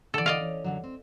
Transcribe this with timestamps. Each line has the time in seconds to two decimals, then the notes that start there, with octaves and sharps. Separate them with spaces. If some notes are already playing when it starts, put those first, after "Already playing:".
0.14 D3 E3 A4 D5
0.26 D5 D#5 F5
0.41 C#4
0.64 F#2 D3 F#3
0.84 C4